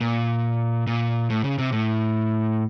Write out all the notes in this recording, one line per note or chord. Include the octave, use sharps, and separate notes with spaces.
A#2
A#2
A2
C#3
C3
A2